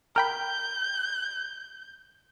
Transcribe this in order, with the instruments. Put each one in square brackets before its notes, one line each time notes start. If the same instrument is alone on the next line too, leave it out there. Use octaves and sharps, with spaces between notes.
[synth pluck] A#4 G5 B5 [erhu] G6